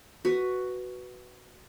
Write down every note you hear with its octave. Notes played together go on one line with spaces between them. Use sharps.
F#4 B4